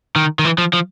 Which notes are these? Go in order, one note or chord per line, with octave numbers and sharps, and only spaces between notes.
D#3
D#3
E3
F3
F3